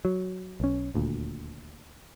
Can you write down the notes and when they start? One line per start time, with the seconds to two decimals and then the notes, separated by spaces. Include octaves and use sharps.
0.05 F#3
0.60 B1 C#4
0.94 D#1 D2 A#2